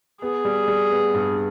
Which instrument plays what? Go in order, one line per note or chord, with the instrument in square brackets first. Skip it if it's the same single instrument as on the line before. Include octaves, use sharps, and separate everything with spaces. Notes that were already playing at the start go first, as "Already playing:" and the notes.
[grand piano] B3 [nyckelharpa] G#4
[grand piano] G3
G3
B3
G2